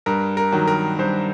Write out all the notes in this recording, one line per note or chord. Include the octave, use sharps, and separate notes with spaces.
G2 A#4
A#4
D#3 F#3
A#4
G2 C5